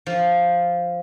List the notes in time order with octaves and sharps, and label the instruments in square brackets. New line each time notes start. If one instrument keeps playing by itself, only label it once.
[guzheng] F3